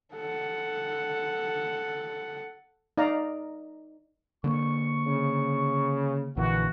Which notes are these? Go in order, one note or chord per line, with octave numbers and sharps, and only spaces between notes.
A4 F#5
D#4 D5 F5 A#5
D3 A#3 C#6
C#3
A#1 A#2 D3 E3 F#4